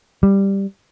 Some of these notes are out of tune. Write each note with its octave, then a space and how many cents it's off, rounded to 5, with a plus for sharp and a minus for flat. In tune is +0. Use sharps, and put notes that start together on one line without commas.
G3 +5